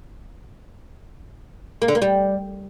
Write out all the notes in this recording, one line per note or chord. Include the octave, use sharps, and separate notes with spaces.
A#3
D3
A#3
G3